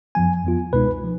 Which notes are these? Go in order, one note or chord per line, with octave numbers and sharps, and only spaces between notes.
F#2 F3 B3 G#5
F2 F3 B3 F4
C#2 B2 G#3 D#4 B4
F3